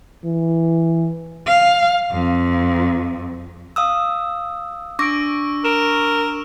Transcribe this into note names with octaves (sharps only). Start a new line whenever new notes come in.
E3
F5
F2
F5 D#6 E6
D4 C#6 D6 E6 A#6 D7
A#4 D7 E7